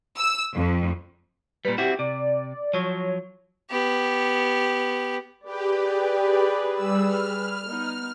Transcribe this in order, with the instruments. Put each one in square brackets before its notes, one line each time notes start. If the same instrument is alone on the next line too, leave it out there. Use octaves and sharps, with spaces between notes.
[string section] E6
F2
[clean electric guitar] A#2 G3 [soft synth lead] B4
[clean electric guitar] C4 E4 F#4 [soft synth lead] G4
[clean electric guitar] C3 [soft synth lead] D5
[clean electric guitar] F3 F#3 [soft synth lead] C#5
[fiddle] B3 G4
[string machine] G4 [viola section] G#4 B4 D5
[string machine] G3 E6
F6
[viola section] B3 D#4